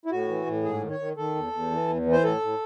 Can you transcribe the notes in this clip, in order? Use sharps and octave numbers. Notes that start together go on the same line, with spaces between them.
E4
A2 F#4
E3
A2
G#2 G#4
D#3
C#5
D#3
D#3 A4
E2
E2
E3
E2
E3
C5
A2 A4
A2